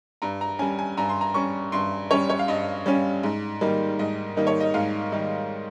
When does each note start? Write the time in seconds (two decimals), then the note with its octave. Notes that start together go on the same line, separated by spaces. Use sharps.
0.22 G2 A#5
0.41 A#5
0.59 C#4 G#5
0.62 G3
0.79 G#5
0.97 G2 A#5
1.09 C6
1.21 A#5
1.34 G3 C#4 C#6
1.72 G2 C6
2.11 G3 C#4 C#5
2.30 C#5
2.39 F5
2.48 G2 D#5
2.86 G3 C#4
3.23 G#2
3.61 D#3 G3 A#3 D#4
3.99 G#2 D#5
4.37 D#3 G3 A#3 D#4
4.47 C#5
4.60 D#5
4.74 G#2 F5
5.12 D#3 G3 A#3 D#4